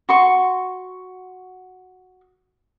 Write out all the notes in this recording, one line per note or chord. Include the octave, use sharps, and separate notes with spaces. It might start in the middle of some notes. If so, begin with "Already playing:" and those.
F#4 C6 C#6